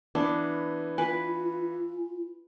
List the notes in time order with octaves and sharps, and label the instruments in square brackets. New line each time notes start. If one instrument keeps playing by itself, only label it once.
[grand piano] E3 B3 [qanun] D4
[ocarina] F4 [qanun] B4 [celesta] G#5